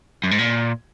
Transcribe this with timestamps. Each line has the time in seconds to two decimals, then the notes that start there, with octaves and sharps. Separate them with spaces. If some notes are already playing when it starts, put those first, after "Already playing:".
0.24 F#2
0.31 G#2
0.39 A#2